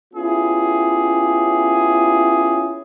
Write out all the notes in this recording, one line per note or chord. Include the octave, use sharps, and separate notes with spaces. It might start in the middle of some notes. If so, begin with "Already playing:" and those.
B3 C#4 E4 F4 G4 G#4